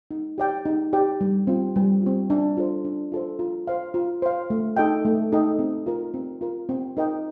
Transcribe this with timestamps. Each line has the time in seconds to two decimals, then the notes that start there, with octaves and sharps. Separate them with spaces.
0.11 D#4
0.38 G4 D5 G5
0.65 D#4
0.93 G4 D5 G5
1.21 G3
1.47 C4 F4
1.76 G3
2.02 C4 F4
2.30 D4
2.57 F4 A4 C5
2.85 D4
3.12 F4 A4 C5
3.39 F4
3.67 C5 F5
3.94 F4
4.22 C5 F5
4.50 A3
4.77 D#4 A4 D#5 G5
5.05 A3
5.32 D#4 A4 D#5 G5
5.59 C4
5.86 F4 A#4
6.14 C4
6.41 F4 A#4
6.69 C4
6.97 D#4 A#4 D#5 G5